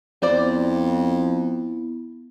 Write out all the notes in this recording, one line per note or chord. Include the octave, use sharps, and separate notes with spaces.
F2 B3 E4 F4 C5 D5